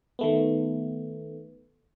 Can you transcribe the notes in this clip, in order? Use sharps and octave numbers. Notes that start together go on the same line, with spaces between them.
D#3 A3 B3